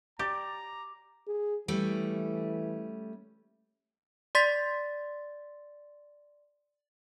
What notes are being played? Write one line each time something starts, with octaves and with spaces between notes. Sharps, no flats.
G4 D5 A#5 D6
G#4
E3 G3 A3 C#4
D5 C6 A6 B6